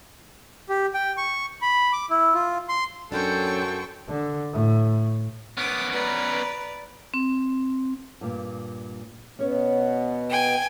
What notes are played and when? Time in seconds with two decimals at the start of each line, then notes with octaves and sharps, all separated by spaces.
0.69 G4
0.94 G5
1.17 C#6
1.62 B5
1.93 D6
2.10 E4
2.34 F4
2.69 C6
3.12 F#2 F#3 C#4 D4 A4 C5 G5 C#6
4.09 D3
4.53 A2
5.57 B3 C#4 D6 D#6
5.92 B4 D5 A#5
7.14 C4
8.21 G2 A#2
9.39 B2 B3 C#4 C#5
10.30 G5 G#5